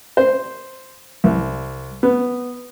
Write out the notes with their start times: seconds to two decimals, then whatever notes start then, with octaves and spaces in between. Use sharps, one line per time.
0.17 C5
1.24 C2
2.03 B3